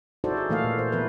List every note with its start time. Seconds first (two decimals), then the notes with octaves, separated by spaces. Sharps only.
0.24 D#4 E4 F#4 A4 C5 D5
0.37 F#4 G#4
0.49 A#2 E3 A3 A#3 A4 F5
0.64 A#2
0.79 C5
0.92 E3 B3 E4 A#4 B4